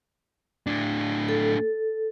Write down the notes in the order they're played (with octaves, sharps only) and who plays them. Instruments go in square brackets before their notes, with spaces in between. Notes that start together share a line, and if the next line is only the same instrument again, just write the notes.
[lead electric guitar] A2 D4
[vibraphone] A4